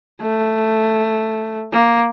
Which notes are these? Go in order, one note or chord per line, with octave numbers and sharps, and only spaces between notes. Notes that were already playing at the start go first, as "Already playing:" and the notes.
A3
A#3